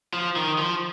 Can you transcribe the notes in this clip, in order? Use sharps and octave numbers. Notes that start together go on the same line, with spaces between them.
F3
D#3
F3